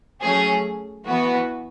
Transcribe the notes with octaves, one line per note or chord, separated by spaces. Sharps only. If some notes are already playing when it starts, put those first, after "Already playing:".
F#3 A3 C#4 G#4
E3 B3 F#4 B4